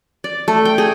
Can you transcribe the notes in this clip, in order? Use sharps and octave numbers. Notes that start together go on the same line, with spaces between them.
D5
A3
G5
G#4